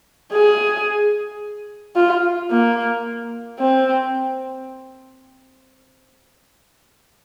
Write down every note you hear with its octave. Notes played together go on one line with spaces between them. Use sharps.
G#4
F4
A#3
C4